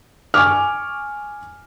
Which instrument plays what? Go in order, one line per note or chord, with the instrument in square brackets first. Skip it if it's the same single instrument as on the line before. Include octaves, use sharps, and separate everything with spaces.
[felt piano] G#5 C#6 D6 F6